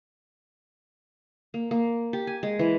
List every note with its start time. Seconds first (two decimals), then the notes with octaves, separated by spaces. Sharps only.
1.54 A#3
1.71 A#3
2.13 G4
2.27 G#5
2.43 G#3
2.59 E3